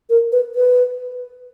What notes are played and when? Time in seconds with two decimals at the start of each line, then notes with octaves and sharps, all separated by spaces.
0.10 A#4
0.32 B4
0.55 B4